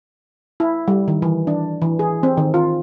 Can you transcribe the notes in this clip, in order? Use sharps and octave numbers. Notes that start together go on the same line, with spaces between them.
E4
G3
D#3
E3
D4
E3
G#4
C4
D#3
F4